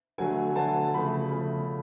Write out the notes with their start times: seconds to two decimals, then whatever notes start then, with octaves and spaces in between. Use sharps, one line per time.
0.18 D3 F#3 A3 G#5
0.56 D3 F#3 A3 A5
0.94 C#3 F3 A3 B5
1.32 C#3 F3 A3